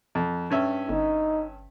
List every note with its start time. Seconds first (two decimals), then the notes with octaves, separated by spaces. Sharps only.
0.15 F2
0.50 G2 C#4 E5
0.89 G1 D#4